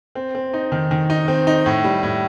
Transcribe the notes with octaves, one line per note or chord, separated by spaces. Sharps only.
C4
C4
D#4
D#3
D#3
D#4
C4
D#4
A2
G3
A2